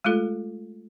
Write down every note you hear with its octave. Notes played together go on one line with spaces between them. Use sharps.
G#3 A3 F4 A4